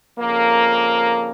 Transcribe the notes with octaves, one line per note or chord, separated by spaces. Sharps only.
F2 C#3 F3 A#3